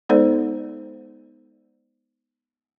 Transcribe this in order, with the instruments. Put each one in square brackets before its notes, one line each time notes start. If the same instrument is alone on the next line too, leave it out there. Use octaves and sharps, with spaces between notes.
[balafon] G#3 B3 D#4 A4 C5 D5